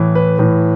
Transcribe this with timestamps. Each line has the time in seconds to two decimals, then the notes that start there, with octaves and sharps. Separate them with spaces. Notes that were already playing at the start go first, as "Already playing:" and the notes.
Already playing: A2 E3
0.15 B4
0.39 A2 E3